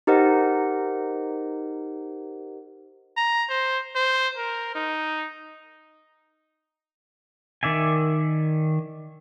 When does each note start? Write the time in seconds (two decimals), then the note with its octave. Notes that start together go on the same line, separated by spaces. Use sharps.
0.07 D#4 G4 A#4 C5 D#5 F#5
3.17 A#5
3.50 C5
3.95 C5
4.37 A#4
4.75 D#4
7.63 D#3 D5 E5 G#5